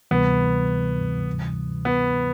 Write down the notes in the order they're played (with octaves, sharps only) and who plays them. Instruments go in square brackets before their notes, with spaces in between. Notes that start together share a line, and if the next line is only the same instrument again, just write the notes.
[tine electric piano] D2 C3 E3 G3 [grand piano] B3
[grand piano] B3